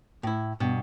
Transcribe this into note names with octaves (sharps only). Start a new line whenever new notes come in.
A2 E4
G2 B2